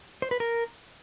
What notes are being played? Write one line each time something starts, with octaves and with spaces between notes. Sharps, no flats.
C5
B4
A#4